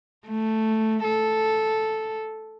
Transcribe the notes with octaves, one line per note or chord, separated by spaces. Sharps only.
A3
A4